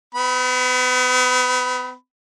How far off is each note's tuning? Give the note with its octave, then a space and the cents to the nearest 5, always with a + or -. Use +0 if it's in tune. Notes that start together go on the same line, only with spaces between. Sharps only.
B3 +40 B5 +0